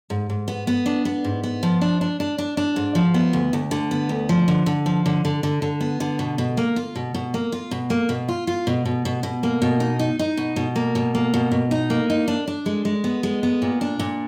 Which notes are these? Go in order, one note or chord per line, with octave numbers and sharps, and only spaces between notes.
G#2
G#2
B3
B3
D4
B3
G#2
B3
F3
D4
D4
D4
D4
D4
G#2
F3
B3
D2
D2
D3
B3
D2
F3
D3
D3
F3
D3
D3
D3
D3
B3
D3
B2
B2
A#3
F4
B2
B2
A#3
F4
B2
A#3
B2
F4
F4
B2
B2
B2
B2
A#3
B2
D#4
D#4
D#4
B2
B2
A#3
B2
A#3
B2
B2
D#4
A#3
D#4
D4
D4
G#3
G#3
B3
G#3
B3
A#2
D4
A#2